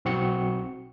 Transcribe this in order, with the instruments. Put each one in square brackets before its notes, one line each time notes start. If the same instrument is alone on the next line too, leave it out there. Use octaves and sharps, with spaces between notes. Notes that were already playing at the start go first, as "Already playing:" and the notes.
[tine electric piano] B1 C4 F#4 C#7